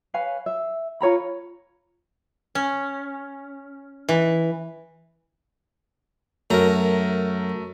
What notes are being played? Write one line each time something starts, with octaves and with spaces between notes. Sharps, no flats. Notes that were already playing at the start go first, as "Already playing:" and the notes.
B4 C#5 F5 G#5
E5
F4 C#5 A#5 B5
C#4
E3
F#2 A3 A#4 A#5